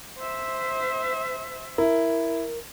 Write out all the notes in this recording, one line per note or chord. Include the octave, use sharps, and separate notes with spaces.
C5 E5
E4 A#4